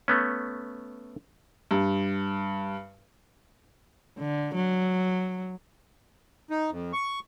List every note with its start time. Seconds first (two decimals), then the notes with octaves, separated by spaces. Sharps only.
0.08 A3 B3 C#4
1.71 G2
4.18 D3
4.55 F#3
6.50 D#4
6.70 F2
6.93 C#6